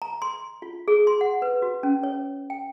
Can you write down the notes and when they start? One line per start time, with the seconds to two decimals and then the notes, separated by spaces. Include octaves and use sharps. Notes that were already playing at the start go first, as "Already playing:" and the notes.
0.02 A#5
0.22 C6
0.62 F4
0.88 G#4
1.07 C6
1.21 F#5
1.42 B4
1.62 F#4
1.83 C#4
2.03 C#5
2.50 G5